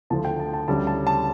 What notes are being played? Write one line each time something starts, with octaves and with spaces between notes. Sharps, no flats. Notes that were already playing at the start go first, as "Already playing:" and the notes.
D2 D3 F3 A3 A5
G5
A5
A5
D2 C#3 G3 A5
A5
A5